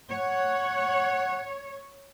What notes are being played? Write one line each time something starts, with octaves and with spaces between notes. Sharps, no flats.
C#5 F#5